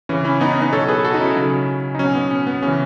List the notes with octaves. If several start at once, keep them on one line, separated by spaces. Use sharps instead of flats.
C#3 E3 C#4
C#4 E4
B3 D#4
C#4
B3 D#4
B2 F#3 A4 C#5
G#4 B4
G#4
F#4 A4
D#4
C#4 E4
C#3 F#3
D#4
B2 F#3 C#4
B3
C#4
B3
C#3 E3 C#4